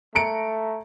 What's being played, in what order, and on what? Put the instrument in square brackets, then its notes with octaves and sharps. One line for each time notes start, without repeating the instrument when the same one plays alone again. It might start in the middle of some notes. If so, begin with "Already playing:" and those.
[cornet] A3 [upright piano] A#5 C#7 D7